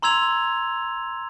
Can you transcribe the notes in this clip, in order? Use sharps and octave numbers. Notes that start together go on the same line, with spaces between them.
A#5 C6 E6 G#6 F7